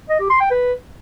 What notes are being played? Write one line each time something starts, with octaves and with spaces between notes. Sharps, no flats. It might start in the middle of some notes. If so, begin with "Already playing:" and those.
D#5
G4
C6
G5
B4